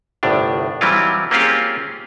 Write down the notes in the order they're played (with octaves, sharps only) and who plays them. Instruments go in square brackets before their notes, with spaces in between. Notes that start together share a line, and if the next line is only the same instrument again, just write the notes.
[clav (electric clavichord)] G1 C2 A2 D4
E3 F#3 G3 C4 E4 F4
A#3 C4 C#4 F4 G4 G#4